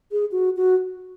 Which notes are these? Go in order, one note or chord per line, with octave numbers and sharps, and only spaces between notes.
G#4
F#4
F#4